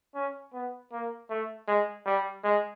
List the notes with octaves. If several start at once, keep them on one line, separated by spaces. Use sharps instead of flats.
C#4
B3
A#3
A3
G#3
G3
G#3